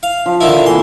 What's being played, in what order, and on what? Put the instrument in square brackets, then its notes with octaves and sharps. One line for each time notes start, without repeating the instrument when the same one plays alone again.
[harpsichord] F5
[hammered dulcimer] F3
[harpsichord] D3 D#3 E4
[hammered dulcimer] E3 A3 B3 [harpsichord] C6